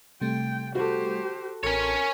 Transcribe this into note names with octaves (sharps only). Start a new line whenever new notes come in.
C3 G3 A3 G5
F#4 G4 A4 C5
A1 C#4 A#4 C#5 A5 C6